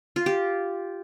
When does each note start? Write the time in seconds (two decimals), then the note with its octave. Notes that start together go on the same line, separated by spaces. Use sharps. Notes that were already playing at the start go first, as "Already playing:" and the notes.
0.16 F4
0.26 G4